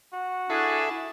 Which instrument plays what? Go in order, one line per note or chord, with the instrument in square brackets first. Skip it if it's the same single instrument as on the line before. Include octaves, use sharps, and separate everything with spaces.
[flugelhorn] F#4
[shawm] D4 [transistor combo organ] E4 A4 [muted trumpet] G#4